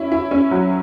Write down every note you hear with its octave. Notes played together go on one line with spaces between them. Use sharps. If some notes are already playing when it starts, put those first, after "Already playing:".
Already playing: C#4 E4
E4
C#4
F#3